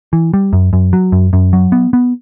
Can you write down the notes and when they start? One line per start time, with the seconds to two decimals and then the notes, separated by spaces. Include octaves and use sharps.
0.13 E3
0.34 G3
0.53 F#2
0.73 F#2
0.93 F#3
1.12 F#2
1.33 F#2
1.53 F#3
1.72 B3
1.93 B3